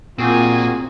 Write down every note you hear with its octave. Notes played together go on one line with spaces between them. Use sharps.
A#2 D#3 C4 F4 F#4 G#4 G#5